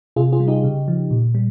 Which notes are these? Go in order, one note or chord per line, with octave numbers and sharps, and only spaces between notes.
C3 F4 G#4
F4 G#4
G3
D#4 G4
C#3
F3
A#2
G3